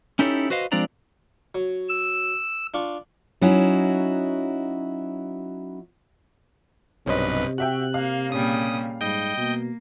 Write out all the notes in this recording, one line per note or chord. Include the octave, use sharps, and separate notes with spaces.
C#4 D#4 E4 G4 A4 C#5
F#4 B4 C5 D#5 F5
F3 G#3 C4 D4 D5 A#5
F#3
E6
D4 F4 C#6
F#3 C#4 D#4 E4 F#4
B1 G2 C3 C#4 B4 C5 D#5
F#4 E5 G5 F#6
A#3 F5
A#2 C#3 G3 D#6
G#2 G3 D#5 G5
B2 A#3